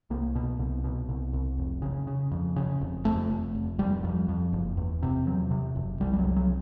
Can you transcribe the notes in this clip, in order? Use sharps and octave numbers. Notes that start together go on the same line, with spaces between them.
C2 A#3
B2
C2
B2
C2
C2
F1
C#3
C#3
F2
C#3
F1
F2 A3
F1
F1
F1 G3
F2
F2
F#1
E2
C3
E2 F#3
C3
F#1
C2 G3
G3
F#3
C2
F#3